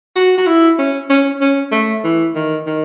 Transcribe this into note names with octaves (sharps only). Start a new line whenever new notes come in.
F#4
F#4
E4
C#4
C#4
C#4
A3
E3
D#3
D#3